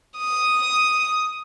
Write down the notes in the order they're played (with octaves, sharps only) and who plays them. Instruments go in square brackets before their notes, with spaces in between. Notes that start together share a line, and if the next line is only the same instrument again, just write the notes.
[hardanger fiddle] D#6